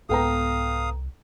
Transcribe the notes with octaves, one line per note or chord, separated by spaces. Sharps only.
C2 G#2 B3 A4 F5 G5 A#5 D#6